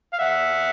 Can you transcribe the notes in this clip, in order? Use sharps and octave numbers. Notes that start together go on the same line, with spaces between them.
F5
E5 F#5